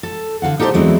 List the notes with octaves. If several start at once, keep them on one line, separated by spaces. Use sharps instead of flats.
A4
D3 F4 F5 F#5
D#4 G4 A4 A#4 C5 D5
E2 F#3 G#3 C4 D4 E4